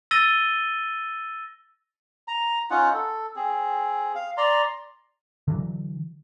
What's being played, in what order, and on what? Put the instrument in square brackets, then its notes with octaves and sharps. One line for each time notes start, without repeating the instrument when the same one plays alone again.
[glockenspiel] E6 A6 A#6 D#7 G7
[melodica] A#5
C#4 D#4 F4 F#5
A4
C4 G#4
F5
D5 A#5 C6
[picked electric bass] D3 E3 F#3